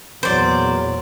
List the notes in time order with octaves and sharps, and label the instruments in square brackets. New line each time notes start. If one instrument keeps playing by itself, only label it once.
[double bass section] E2 A#2 [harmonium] F#3 [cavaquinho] C5 D5